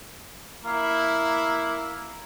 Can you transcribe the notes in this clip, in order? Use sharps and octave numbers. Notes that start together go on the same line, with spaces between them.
A#3 E4